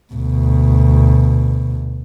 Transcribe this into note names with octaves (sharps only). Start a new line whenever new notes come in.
D2 B2